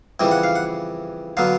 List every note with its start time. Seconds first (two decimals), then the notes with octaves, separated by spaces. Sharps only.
0.20 F2 C#3 E3 G3 G5
0.31 F#5
0.43 F5
0.55 F#5
1.37 D3 F#3 B3 F5